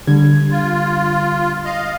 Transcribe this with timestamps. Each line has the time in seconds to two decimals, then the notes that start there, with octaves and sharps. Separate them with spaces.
0.07 D3 G3 G#6
0.51 F4
1.65 D#5 F5